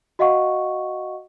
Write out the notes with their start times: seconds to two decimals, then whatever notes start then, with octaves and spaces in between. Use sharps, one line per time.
0.19 F#4 D#5 F5 F#5 C#6